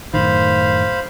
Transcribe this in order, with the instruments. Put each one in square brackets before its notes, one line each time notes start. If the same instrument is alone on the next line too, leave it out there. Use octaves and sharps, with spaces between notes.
[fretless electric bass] F#2 A2 D#3 [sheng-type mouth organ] C5 F5 B5